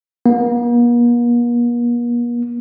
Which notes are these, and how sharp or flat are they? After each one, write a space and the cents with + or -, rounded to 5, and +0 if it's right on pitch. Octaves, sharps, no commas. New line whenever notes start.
A#3 +45